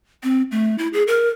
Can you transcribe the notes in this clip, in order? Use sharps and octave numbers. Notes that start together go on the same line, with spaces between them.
C4
A3
E4
G#4
A#4